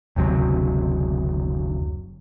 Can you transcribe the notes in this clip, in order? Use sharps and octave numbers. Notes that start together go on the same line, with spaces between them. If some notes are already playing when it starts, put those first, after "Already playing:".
F#1 D2 C3 F#3